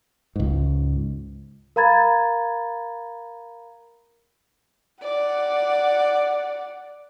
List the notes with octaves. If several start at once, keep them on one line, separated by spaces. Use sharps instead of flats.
C#2 G#2
A#4 F5 A#5 B5 G#6 A6
D5 F#5